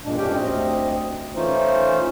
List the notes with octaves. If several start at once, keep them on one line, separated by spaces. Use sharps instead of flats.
E2 G2 A#2 G#3 D4
F2 A2 C#4 D4 G4 G5
D2 C4 D#5
E3 A3 C#4 D#4 F4 C5